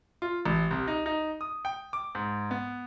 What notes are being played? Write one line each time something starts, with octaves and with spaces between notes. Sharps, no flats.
F4
A1
C2
D#4
D#4
D#6
G5
D6
G#2
B3